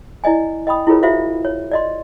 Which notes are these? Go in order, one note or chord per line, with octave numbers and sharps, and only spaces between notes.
E4 D5 D#5 G#5
D#5 G5 B5 D#6
E4 F4 G#4 A#4 B4 C#5
F4 F#4 C5 E5 F5
C#5
D5 D#5 C6